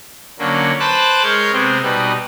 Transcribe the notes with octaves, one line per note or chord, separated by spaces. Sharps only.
D3 F#3 A#3 C#4
B4 C5 A5 B5 D6 F#6
G#3 A#4 C#5 F6 G6
C3 G#3 B3 C4
B2 G3 B3 D#4